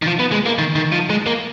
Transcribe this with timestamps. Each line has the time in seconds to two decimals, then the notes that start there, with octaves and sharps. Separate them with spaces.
0.02 D#3
0.06 F3
0.19 B3
0.32 G#3
0.46 A#3
0.58 D#3
0.76 D#3
0.92 F3
1.10 G#3
1.27 A#3